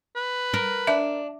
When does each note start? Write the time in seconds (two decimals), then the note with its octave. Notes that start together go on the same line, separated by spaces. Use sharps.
0.16 B4
0.54 A#4
0.87 D4 E5